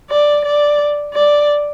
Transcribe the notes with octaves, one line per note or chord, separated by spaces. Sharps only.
D5
D5
D5